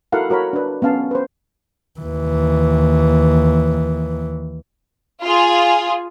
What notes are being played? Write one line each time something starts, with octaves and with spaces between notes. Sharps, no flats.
E4 F#4 A4 A#4 F5 F#5
E4 F#4 A#4 C#5 B5
D4 B4
B3 C#4 F5 A5
B4 C5
D#2 E3
F4 G#4